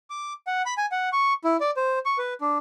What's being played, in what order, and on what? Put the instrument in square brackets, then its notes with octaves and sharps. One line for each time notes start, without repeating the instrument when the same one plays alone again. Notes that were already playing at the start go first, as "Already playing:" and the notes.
[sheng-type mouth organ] D6
F#5
B5
G#5
F#5
C#6
E4
D5
C5
C#6
B4
D4